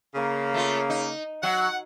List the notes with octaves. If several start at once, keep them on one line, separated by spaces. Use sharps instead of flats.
C#3 A#3
A3 F4
D#4
F#3 F#5